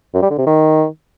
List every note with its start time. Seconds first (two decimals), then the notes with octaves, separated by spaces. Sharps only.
0.14 F#2
0.22 G3
0.30 D3
0.38 C3
0.46 D#3